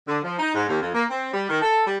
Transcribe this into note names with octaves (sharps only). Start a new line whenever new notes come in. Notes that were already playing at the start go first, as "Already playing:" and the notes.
D3
F3
D#4
G#2
D#2
F2
A#3
C4
G3
D#3
A4
G3